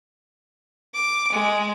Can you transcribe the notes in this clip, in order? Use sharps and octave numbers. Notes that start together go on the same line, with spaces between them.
D6
G#3